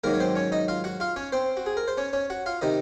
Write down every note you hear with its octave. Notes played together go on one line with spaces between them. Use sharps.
G#2 D#3 F#3 A#3 A#4
C#5
C4 C5
C#4 C#5
D#4 D#5
F4 F5
F#4 F#5
F4 F5
C#4 C#5
C4 C5
F#4
G#4
A#4
C5
C#4 C#5
C#4 C#5
F#4 F#5
F4 F5
C3 D#3 D#4 D#5